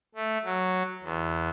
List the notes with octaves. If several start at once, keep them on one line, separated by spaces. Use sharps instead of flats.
A3
F#3
E2